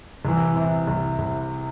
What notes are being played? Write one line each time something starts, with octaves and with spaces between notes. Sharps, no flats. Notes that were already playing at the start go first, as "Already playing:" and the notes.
C2 E3
C3
C2
C2